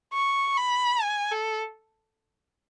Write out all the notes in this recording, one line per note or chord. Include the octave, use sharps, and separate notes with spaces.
C#6
B5
G#5
A4